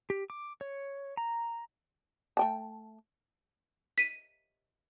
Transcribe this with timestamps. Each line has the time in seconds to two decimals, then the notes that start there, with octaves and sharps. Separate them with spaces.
0.10 G4
0.30 D6
0.61 C#5
1.17 A#5
2.37 A3 G5 A5
3.98 B6 D#7